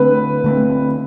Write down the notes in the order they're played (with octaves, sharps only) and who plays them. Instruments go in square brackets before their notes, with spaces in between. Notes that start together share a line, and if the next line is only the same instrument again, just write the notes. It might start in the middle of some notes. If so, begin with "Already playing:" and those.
Already playing: [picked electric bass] D3 A3 C4 [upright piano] B4
[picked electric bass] D3 A3 C4